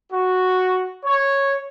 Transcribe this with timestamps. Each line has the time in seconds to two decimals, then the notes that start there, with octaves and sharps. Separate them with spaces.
0.13 F#4
1.05 C#5